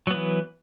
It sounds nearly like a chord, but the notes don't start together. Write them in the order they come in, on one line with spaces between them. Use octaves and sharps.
F#3 B3 E3